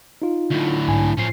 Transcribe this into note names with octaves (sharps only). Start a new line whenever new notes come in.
D#4 F4
D2 A2
B1 G#2 G#5
A2 F3 C#4 C7